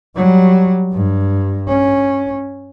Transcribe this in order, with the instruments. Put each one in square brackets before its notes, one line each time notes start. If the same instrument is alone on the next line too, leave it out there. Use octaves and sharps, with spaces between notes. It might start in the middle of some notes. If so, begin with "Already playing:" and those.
[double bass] F#3 G3
G2
C#4